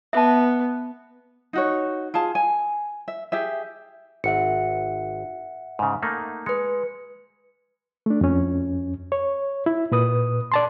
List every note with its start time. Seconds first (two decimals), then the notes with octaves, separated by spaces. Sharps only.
0.13 B3 E5 A5
1.53 D#4 F#4 C#5
2.14 F4 G#4 A5
2.35 G#5
3.08 E5
3.32 G4 G#4 E5
4.24 G#1 E5 F#5 C#7
5.79 G#2 C#3
6.02 A3 A#3 D#4
6.46 G#3 B4 C#7
8.06 A3 D4
8.21 F2 C#4
9.12 C#5
9.66 E4
9.92 A#2 B4 D#6
10.52 D5 A5 C6